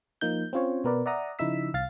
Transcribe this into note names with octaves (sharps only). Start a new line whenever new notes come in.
F3 A#3 D#4 G6
C4 C#4 F4 C5 C#5
B2 B3 A#4 B4 D5
D5 E5 F#5 A#5 D#6
C#3 F3 D#4 E4 E6 B6
C2 F5 A6